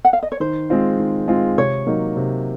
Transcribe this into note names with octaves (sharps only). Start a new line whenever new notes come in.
F#5
F5
D#5
C#5
D#3 C5
G#3 C4 F4
D#3
G#3 C4 F4
C3 C#5
F#3 A#3 D#4
C3